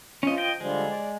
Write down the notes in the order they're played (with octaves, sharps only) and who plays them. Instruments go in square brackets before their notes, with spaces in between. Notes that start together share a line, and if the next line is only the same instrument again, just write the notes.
[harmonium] F3 [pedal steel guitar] C#4 D#5
[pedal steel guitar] D#5 G5
[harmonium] D3 F3 G3 [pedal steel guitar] G#3
[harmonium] D5